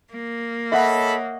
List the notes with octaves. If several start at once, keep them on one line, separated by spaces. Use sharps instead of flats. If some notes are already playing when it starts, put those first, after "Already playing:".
A#3
A4 C#5 D#5 E5 F#5 B5